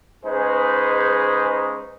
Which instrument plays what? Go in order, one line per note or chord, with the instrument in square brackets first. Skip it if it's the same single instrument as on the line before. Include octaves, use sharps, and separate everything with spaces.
[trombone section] C#3 G#3 D#4 G#4 B4 C5